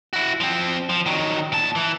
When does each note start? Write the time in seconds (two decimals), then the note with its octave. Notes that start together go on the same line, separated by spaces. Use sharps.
0.13 E4 F#4
0.41 F3 C4
0.90 F3
1.06 D#3 F#3
1.52 A#2 A5
1.75 E3